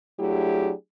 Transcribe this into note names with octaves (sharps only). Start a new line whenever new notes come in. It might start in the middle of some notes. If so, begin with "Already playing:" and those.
F#3 A3 D4 E4 G4 G#4